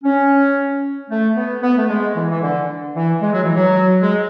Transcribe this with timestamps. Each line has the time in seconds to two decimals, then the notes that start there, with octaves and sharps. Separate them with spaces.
0.04 C#4
1.10 A3
1.36 B3
1.62 B3
1.77 A3
1.89 G#3
2.16 E3
2.31 E3
2.42 D3
2.95 E3
3.21 G#3
3.33 F#3
3.43 E3
3.55 F#3
4.01 G#3